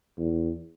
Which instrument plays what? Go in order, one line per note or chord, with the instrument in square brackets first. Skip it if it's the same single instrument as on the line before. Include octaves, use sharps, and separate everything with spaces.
[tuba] E2